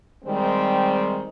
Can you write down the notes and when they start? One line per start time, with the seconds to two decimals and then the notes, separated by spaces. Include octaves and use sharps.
0.25 D#3 G3 G#3 C4